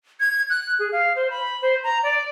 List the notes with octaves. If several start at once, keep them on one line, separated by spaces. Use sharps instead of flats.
G#6
F#6
G#4
F5
C5
B5
C5
A#5
D5